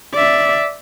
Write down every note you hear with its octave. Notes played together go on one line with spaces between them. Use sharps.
D5 E5